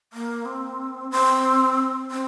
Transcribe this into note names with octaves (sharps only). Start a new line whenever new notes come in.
A#3
C4
C4
C4